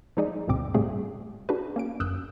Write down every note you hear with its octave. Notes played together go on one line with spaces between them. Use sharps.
F3 G#3 D#4 G#4 D5 D#5
G#1 D2 G2 B2 C4 D6
A2 C#3 G3 A3 C4 G#4
D4 F#4 G#4 B4
A#3 C#4 D7
G1 F#2 D#6 E6 F#6 G6